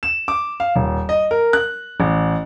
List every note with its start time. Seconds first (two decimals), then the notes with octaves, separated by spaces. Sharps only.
0.03 E7
0.28 D6
0.60 F5
0.76 D#1
1.09 D#5
1.31 A#4
1.53 F#6
2.00 A1